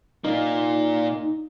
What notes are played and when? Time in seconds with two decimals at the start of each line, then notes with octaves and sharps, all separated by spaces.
0.24 A#2 A#3 D#4